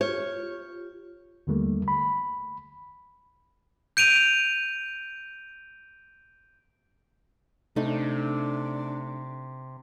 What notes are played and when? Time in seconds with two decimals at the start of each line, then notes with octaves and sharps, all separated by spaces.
0.01 F4 G4 C#5
1.47 D#2 D3 G3 A3 A#3
1.88 B5
3.97 G6 D7 D#7 F7
7.76 C3 A3 D4 D#4